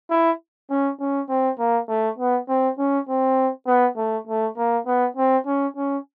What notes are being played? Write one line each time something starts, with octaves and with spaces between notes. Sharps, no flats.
E4
C#4
C#4
C4
A#3
A3
B3
C4
C#4
C4
B3
A3
A3
A#3
B3
C4
C#4
C#4